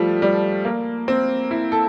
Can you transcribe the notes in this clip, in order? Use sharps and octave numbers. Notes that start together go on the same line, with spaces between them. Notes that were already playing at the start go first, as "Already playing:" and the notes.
Already playing: F3 G3 A3
G3
A#3
C4
E4
A4